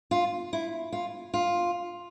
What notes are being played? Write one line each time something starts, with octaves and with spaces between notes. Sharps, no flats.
F4
E4
F4
F4